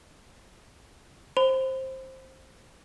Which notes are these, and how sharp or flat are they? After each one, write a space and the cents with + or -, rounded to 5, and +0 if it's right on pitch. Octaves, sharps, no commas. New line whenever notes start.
C5 +15 B5 +45